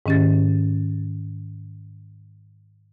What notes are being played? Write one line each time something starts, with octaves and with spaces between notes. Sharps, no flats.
G#2 D#3 C#4 G4 A6